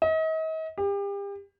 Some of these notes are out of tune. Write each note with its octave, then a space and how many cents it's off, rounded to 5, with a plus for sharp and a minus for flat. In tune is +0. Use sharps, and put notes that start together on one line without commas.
D#5 +40
G4 +35